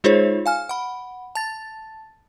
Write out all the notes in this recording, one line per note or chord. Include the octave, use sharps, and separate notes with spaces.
G#3 D#4 F4 G#4 C5 C#5
F5 G#5 F6
F#5 B5
A5 A6